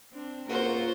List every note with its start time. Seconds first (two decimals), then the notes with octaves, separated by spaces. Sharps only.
0.14 C4 D4
0.49 C#2 A#3 F4 F#4 A#4 C5 F#5